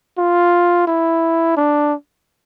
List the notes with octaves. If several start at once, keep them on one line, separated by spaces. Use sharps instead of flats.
F4
E4
D4